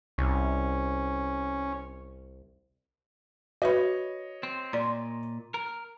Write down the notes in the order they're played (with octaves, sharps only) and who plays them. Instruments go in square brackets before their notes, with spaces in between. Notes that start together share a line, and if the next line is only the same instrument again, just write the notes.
[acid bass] C2 [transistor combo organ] C#4
[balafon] F#4 B4 B5 [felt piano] C#5 D#5
[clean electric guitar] C4
[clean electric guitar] A#2 [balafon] D5 C6
[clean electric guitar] A#4